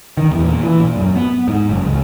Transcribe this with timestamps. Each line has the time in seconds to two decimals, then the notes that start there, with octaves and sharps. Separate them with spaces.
0.17 D#3
0.31 E2
0.43 A#2
0.61 E3
0.80 A#2
0.96 F#2
1.16 B3
1.48 G#2
1.69 F#1
1.85 C#2